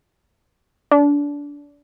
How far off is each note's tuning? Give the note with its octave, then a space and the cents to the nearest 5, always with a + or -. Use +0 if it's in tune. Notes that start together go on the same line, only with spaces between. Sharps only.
D4 -25